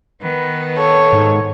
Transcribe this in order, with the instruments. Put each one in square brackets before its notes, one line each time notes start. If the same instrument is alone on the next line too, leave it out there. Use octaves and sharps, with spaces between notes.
[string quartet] D#3 B3 [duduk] B4
[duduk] A4 [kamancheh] C#5
[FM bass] G#2